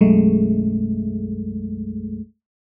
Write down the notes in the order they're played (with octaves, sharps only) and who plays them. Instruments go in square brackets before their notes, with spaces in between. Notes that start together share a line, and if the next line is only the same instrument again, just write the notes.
[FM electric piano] B1 F#2 G#3 A3